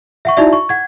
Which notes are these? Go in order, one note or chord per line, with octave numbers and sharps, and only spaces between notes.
E5 F#5 C#6
D#4 E4 F#4 D5 E5
C#6
F#5 G#6